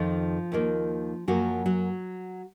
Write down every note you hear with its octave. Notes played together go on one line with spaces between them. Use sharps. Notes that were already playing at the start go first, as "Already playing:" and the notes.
Already playing: F2 D#3 F3 F4
D#2 D#3 A#3
F#2 F3 F#3 A#3 F#4
F#3 F#4